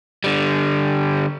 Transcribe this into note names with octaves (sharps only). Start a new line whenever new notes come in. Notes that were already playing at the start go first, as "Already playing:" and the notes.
D3 G3